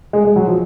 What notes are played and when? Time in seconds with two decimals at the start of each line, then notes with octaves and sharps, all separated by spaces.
0.13 G#3
0.25 G#3
0.36 F#3
0.47 F3